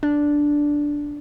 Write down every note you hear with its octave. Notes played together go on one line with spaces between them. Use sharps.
D4